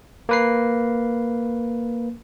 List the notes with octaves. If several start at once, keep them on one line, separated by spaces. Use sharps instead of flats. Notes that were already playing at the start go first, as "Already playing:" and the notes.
A#3 B4 C7